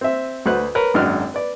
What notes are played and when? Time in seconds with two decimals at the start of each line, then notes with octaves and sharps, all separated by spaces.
0.01 C4 E5
0.46 D2 F#4 B4 C5 F#6
0.75 A#4 B4 C#5
0.94 G#1 F#2 D4 D#5 F6 F#6
1.34 B4 D5